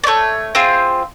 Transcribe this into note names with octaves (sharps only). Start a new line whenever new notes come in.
D5
A3 C#5
C4 F4 G#4